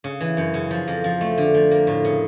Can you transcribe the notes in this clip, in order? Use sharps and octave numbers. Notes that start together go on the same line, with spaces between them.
C#3
E3
F#2
C#3
F3
F2
F3
A3
D3
F3
A#3
A2
C#3